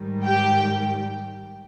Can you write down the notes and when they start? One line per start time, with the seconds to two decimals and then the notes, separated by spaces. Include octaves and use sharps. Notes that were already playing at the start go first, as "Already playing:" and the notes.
Already playing: G#2 D#3 G3
0.25 G4 G5